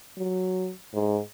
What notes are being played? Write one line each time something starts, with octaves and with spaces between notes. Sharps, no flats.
F#3
G#2